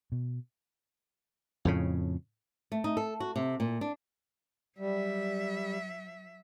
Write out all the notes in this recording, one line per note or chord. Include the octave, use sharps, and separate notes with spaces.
B2
F2 A2 C#3
A3
D#4
A4
F#4
C3
A#2
D4
F#3 G3 E5